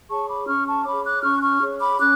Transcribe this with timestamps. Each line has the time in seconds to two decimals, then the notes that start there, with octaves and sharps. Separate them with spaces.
0.09 G#4 C#5 A5 C#6
0.28 B5 D6
0.47 C#4 C#6 F6
0.66 A5 C#6
0.85 G#4 C#5 B5 D6
1.05 D6 F#6
1.23 C#4 C#6 F6
1.37 F#6
1.42 C#6 F6
1.61 G#4 C#5
1.81 B5 D6
1.99 C#4 D6 F#6